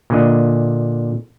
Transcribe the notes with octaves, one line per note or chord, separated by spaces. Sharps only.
A#2 D3 D#5